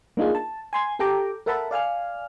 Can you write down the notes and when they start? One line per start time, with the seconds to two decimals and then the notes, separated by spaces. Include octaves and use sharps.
0.17 A#3 D4 D#4 F4 G#4
0.35 A5
0.73 G#5 C6 G#6
0.99 G4 A4 G5 A#5 D6
1.46 A4 A#4 E5 F#5 A5 B5
1.71 D5 F5 G#5 F6